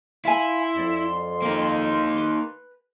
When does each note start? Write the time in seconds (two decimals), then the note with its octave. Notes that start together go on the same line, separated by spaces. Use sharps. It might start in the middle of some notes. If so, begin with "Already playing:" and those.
0.25 E4 F5 G#5 C6
0.77 F2 D5
1.42 A#3 D#4
2.18 B4